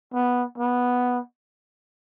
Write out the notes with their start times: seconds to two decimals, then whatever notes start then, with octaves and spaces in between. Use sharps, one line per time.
0.13 B3
0.58 B3